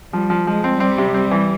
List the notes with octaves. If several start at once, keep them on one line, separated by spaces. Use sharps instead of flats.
F3 G3
F3
F3 G#3
C4
G3 C4
C3
C4
E3